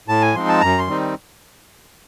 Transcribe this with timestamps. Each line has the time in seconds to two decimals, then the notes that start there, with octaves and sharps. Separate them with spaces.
0.08 A2 A5
0.22 G#5
0.34 F3 G#3 C4 D#4 C6
0.49 A5
0.61 F#2 A#5
0.79 C6
0.88 D#3 G3 C4 D#4